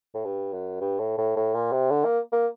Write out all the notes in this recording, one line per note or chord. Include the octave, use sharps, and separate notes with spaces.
A2
G2
F#2
G2
A2
A2
A2
A#2
C3
D3
A#3
A#3